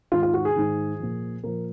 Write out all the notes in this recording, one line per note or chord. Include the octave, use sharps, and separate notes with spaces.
G#2 D#3 F4
F4
F#4
G#4
G#2 D#3
A#2 F3
A#2 F3 A#4